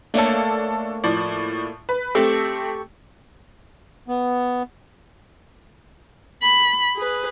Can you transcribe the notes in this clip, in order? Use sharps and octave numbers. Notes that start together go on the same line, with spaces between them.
A3 A#3 D4 A4 C#5
A2 F3 D5
B4
A3 C4 G4 A4 C#6
B3
B5
G#4 B4